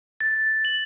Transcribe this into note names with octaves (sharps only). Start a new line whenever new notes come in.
A6
F#7